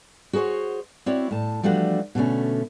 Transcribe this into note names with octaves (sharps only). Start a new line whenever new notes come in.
F#4 G#4 A#4 C5 C#5
C4 E4 F#4 C#5 D5
A2 A5
E3 F3 G3 A3 D4 F#4
B2 D3 A3 C#4